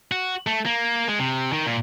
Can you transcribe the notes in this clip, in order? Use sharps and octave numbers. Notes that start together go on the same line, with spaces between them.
F#4
A3
A#3
G#3
C3
D#3
A#2